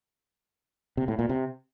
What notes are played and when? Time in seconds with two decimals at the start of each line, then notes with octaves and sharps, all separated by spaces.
0.97 C3
1.08 A2
1.19 A#2
1.29 C3